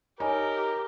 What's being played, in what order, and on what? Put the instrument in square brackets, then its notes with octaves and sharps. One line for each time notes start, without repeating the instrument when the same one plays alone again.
[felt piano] D#4 C#5 [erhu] G4 [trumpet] A#4 [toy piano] G#5 A#5 B5